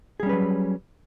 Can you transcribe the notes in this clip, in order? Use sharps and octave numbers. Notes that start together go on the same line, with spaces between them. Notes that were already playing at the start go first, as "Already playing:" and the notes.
F#3 G3 C#4 G#4 B4